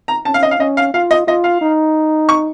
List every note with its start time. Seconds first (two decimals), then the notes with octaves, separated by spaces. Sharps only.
0.08 A#5
0.25 C#4 A5
0.34 F5
0.43 D#5
0.51 F5
0.59 C#4 D#5
0.77 F5
0.94 F4 F5
1.11 D#5
1.27 F4 D#5
1.44 F5
1.61 D#4
2.29 C#6